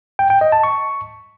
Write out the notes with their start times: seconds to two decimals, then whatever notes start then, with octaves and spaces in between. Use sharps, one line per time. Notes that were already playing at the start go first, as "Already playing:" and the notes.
0.19 G5
0.30 G5
0.41 D#5
0.52 A5
0.63 C#6